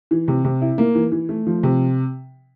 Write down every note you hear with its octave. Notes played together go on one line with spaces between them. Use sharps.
E3
C3
C3
E4
A#3
E3
E3
A3
F3
C3